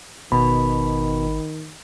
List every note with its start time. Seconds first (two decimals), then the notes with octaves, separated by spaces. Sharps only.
0.32 G#1 B2 D#3 B5